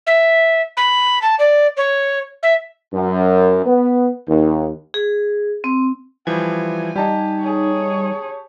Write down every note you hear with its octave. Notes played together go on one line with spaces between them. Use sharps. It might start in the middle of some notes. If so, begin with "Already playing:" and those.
E5
B5
A5
D5
C#5
E5
F#2
B3
D#2
G#4
C4
E3 F3 G3 G#5 G#6
G3 D#4 G4 A5
G#4 C#5